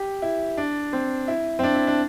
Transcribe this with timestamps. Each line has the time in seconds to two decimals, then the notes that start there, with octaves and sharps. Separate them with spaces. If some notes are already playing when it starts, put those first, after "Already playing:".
Already playing: G4
0.22 E4
0.57 D4
0.93 C4
1.28 E4
1.59 C4
1.63 D4
1.75 E4
1.87 D4